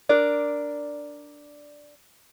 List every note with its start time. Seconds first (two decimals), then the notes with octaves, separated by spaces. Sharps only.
0.09 D4 A#4 D5